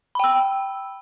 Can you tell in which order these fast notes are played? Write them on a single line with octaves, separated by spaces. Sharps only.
B5 G5 E6